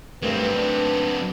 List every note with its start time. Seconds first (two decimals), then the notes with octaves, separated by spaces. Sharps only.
0.23 G2 F#3 A3 C4 A#4 B4
0.56 D4